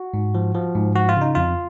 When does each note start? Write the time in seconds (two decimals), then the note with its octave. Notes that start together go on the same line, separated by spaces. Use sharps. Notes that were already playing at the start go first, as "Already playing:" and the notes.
Already playing: F#4
0.14 G#2
0.35 F3
0.55 F3
0.75 G#2
0.95 F3 F#4
1.09 F4
1.16 C#3
1.21 D#4
1.35 F2 F4